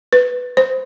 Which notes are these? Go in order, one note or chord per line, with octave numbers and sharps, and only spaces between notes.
B4
C5